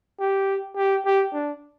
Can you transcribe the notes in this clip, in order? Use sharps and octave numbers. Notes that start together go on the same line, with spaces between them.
G4
G4
G4
D4